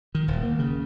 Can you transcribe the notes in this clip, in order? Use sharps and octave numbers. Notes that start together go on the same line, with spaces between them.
D#3
D#1
A#3
C#3